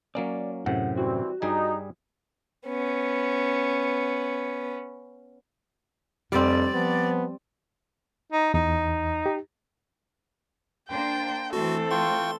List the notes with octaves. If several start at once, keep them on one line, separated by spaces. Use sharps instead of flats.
F#3 A#3 C#4 D5
F#2 A2 C3 F#5
E3 G3 C4 F#4
G2 G3 D#4 G#4
B3 C#4
F1 F2 G3 C4 D5
F3 B3
D#4
E2 D#4
G4
A#3 D4 C5 G5
E3 A3 C4 F#4 A4
F4 G5 C6 C#6